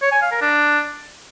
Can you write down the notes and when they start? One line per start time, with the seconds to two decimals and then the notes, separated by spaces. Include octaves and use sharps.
0.02 C#5
0.12 G#5
0.22 F5
0.32 A#4
0.41 D4